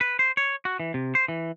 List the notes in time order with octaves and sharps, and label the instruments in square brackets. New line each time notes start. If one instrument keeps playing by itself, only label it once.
[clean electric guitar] B4
C5
C#5
F#4
E3
C3
C5
E3